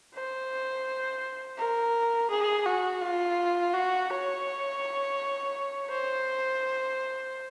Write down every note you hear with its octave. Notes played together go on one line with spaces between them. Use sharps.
C5
A#4
G#4
F#4
F4
F#4
C#5
C5